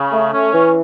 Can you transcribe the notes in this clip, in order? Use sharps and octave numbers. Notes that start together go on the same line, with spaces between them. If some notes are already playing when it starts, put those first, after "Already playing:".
Already playing: C#3
A3
C#4
E3